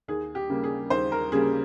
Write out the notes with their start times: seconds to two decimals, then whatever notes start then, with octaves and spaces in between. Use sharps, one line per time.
0.08 D#2 G#4
0.35 G4
0.49 C#3 G3 A#3
0.64 G#4
0.90 D#2 C5
1.12 A#4
1.32 C#3 G3 A#3 G#4